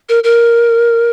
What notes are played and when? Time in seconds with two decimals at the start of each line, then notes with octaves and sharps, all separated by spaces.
0.09 A#4
0.24 A#4